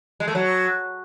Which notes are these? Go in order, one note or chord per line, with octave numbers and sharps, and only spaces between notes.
G#3
A3
F#3